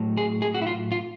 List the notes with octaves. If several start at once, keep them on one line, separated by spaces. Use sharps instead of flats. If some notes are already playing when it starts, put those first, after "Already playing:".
Already playing: A2 F#3 A3
G#4
G#4
F#4
E4
F4
F4